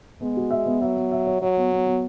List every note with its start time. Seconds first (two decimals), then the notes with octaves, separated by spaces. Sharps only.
0.21 G#3 B3
0.37 F#4
0.51 E5
0.66 B3
0.81 F#3 E5
0.97 B3
1.12 E5
1.27 C#5
1.42 F#3 C#5
1.57 B3
1.72 B3
1.87 B3